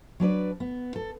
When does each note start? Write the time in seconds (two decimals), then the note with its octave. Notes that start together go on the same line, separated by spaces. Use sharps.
0.20 F#3 D4 B4 D5
0.60 B3
0.96 A4